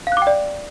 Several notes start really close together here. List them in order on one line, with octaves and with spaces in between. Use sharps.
F5 F#6 D6 G5 D5